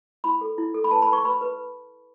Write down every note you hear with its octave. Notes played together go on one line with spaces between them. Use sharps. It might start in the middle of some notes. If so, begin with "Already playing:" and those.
E4 B5
A4
E4
A4
B5
B4 A5
B5
B4
C#6
B4 B5
B4